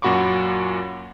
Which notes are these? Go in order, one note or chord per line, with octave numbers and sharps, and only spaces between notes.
F#2 A#2 F#4 B5 C#6 D6